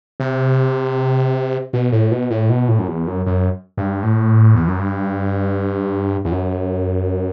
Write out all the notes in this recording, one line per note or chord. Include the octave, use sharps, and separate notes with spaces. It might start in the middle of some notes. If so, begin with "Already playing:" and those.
C3
B2
A2
B2
A2
B2
A2
F#2
E2
F#2
F#2
G2
A2
E2
F#2
G2
E2
F#2